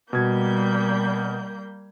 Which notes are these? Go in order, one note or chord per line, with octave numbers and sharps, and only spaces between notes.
B2 G3 A#3 G6 G#6